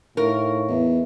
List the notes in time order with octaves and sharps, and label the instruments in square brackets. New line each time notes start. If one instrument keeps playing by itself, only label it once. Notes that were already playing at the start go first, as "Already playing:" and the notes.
[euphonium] A2 [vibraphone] D#4 F5 C#6 [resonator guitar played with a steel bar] A#4
[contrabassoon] E2 [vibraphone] B4 D#5 E5